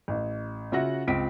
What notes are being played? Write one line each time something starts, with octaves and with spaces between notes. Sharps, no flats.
A1
C#3 F4 F#4 E5 F#5 A#6
C#2 C4 F4 B6 D7